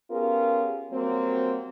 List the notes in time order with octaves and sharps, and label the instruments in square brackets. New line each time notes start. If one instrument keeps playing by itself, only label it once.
[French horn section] B3 C#4 F4 G4 G#4 A#4
F#3 G3 A#3 C4